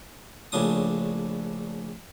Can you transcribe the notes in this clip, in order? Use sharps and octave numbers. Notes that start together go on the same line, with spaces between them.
A#1 A2 C#3 D4 D#6